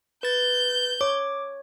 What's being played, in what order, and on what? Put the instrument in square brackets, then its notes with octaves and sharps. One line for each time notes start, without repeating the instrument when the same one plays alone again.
[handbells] B4 A6 [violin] G6
[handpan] C#5 [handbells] D6